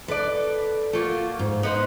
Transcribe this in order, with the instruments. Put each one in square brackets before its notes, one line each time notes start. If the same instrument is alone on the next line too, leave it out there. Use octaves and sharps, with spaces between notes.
[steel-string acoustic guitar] A4 [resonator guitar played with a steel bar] B4 D5
[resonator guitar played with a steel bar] A3 A#3 [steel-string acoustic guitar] F4 F#4
[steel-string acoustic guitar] G#2
[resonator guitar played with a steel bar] B3 D#4 C5